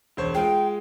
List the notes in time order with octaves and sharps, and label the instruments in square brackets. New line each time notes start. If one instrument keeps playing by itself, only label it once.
[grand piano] E1 C5 C#5
[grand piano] G#3 F4 [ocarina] G5